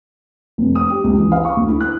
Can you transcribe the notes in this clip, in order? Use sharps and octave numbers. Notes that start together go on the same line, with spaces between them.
F1
D#6
G4
C#2
E3
F5
C#6
D2
E4
F#6